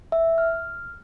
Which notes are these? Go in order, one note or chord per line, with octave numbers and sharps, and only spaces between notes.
E5
F6